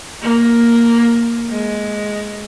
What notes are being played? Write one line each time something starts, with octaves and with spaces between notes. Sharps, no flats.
A#3
G#3